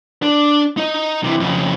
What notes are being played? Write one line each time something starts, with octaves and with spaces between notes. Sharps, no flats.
D4
D#4 D#5
C3 E3
F2 C#3